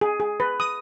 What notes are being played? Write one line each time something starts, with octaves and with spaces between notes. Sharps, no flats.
G#4
G#4
B4
D#6